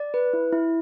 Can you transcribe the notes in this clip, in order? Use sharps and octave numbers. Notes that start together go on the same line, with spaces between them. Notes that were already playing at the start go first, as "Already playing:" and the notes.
Already playing: D5
B4
E4
E4